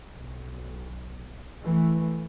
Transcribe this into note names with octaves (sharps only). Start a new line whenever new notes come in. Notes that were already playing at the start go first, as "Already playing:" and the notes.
B1
E3 A3